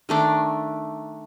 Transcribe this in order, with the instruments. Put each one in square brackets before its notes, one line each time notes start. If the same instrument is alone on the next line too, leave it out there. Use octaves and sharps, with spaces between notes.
[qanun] D#3 A3 D4